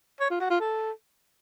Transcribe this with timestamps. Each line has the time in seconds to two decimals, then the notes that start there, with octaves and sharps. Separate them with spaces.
0.21 C#5
0.31 F4
0.40 F#4
0.50 F4
0.60 A4